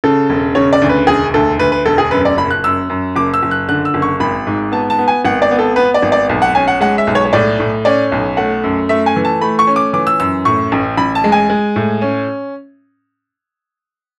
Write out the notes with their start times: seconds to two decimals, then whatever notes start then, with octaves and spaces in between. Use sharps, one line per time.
0.04 C#3 A4
0.30 E1
0.55 C#3 C#5
0.73 D5
0.82 D2
0.89 B4
1.07 E1 G#4
1.34 D2 A4
1.59 D2 B4
1.72 B4
1.86 E1 A4
1.98 G#4
2.11 F#2 B4
2.25 D5
2.37 F#1 B5
2.51 F#6
2.64 F#2 E6
2.89 F#2
3.16 F#1 D6
3.34 E6
3.43 F#1
3.51 F#6
3.69 D3 F#6
3.85 E6
3.94 F#1
4.02 C#6
4.20 G#1 B5
4.47 G#2
4.72 B3 A5
4.90 A5
4.98 B3
5.08 G#5
5.25 G#1 F#5
5.42 D5
5.51 B3
5.59 A4
5.76 B3 B4
5.94 D5
6.02 G#1
6.12 D5
6.29 B1
6.42 F#5
6.55 C#4 G#5
6.68 F#5
6.81 G#3 F#5
6.98 E5
7.07 B1
7.15 C#5
7.25 C#5
7.33 A2 D5
7.60 A2
7.85 C#4 D5
8.12 B1
8.37 A3 F#5
8.64 F#2
8.89 A3 E5
9.06 G#5
9.16 E3
9.25 A5
9.41 A3 B5
9.59 C#6
9.67 C#4
9.76 D6
9.93 E3 D6
10.07 E6
10.20 F#2 E6
10.45 A2 C#6
10.72 A1
10.97 A1 B5
11.15 A5
11.24 G#3
11.32 G#5
11.50 G#3
11.76 A2
12.02 C#4